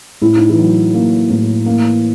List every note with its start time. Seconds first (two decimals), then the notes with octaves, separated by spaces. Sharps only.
0.22 A2 E4
0.36 D#4
0.49 E3 E4
0.58 F#3
0.94 A#3
1.30 A2
1.66 A#3